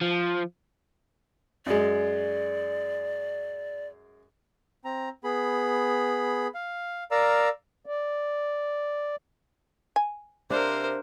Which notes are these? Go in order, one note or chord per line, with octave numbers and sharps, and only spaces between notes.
F3
F#2 G#3 D5
C4 A#5
B3 G#4 B5
F5
A#4 D5 F5 A#5 E6
D5
G#5
C3 D4 A#4 C5 F5